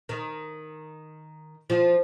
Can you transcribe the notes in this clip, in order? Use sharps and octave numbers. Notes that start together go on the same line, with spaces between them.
D#3
F3